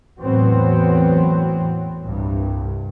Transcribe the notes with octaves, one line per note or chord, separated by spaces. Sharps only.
E2 A2 F#3 B3 C4
C2 G2